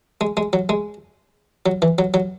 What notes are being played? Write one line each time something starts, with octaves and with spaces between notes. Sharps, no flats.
G#3
G#3
F#3
G#3
F#3
E3
F#3
F#3